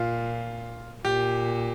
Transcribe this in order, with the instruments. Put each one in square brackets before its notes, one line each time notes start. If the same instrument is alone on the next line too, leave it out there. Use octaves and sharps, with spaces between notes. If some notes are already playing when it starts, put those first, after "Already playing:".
Already playing: [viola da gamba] A#2 [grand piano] F4
[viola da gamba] A#2 [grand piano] G4